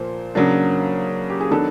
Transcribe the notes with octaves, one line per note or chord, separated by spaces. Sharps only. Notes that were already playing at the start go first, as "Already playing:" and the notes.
Already playing: A#2 F3 A#3 C5
C#3 F#3 A#3 D4
G4
G#4
D#3 F#3 B3 D4 A4